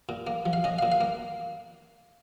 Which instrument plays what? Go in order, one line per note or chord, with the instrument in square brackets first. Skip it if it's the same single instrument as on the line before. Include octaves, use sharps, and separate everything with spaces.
[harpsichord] A#2
A#3
F3
F5
C#4 D#5
A#2 F5
F5
A#3